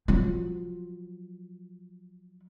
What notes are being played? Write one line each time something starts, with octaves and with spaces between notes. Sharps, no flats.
F3 F#3